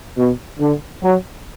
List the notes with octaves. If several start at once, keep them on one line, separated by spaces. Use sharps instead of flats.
B2
D3
F#3